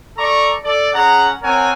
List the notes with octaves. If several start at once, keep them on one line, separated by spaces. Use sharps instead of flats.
A4 D5 A#5 C#6
A4 D5
C#4 G#4 F#5 A#5
C4 A#4 C#5 F#5 G#5